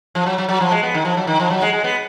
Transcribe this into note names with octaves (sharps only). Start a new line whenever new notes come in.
F3
F#3
F#3
F#3
F3
G#3
B3
D#3
F3
F#3
D#3
F3
F#3
G#3
G#3
B3